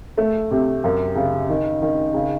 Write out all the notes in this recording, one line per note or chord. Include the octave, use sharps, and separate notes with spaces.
A3
C3
F#2
C#3
D#3
D#3
C#3